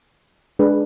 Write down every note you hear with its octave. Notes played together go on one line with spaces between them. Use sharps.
G#3 D4 G#4 B4